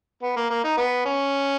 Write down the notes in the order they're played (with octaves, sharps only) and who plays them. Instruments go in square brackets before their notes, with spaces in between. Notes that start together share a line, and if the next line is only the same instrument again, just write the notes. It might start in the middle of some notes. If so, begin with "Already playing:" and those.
[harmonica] B3
A#3
A#3
D#4
B3
C#4